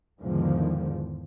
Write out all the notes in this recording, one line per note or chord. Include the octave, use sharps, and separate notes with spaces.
E2 G#2 D3 D#3 F3